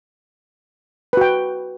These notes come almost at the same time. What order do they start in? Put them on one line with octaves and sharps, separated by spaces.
B4 F#4 G5